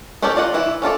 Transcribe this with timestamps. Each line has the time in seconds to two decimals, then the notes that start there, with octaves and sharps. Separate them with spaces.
0.22 B3 C#4 G4 A4 D5
0.36 F4 D5 D#5 F#5
0.54 E3 B3 E4
0.82 C#4 F4 A4 D5